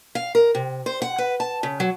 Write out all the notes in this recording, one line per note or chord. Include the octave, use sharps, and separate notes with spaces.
F5
A#4
C3
C5
F#5
B4
A5
C#3
F#3